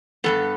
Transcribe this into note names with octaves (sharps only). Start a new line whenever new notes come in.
G2 G3 B3 A4